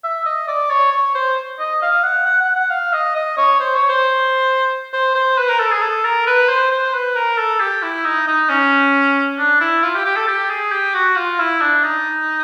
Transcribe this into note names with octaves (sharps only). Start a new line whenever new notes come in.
E5
D#5
D5
C#5
C#5
C5
D#5
F5
F#5
F#5
F#5
F#5
F5
D#5
D#5
C#5
C5
C#5
C5
C5
C5
B4
A#4
A4
G#4
A4
A#4
B4
C5
C5
B4
A#4
A4
G4
E4
D#4
D#4
C#4
D4
E4
F4
G4
G4
A4
G4
G#4
G4
F#4
F4
E4
D4
D#4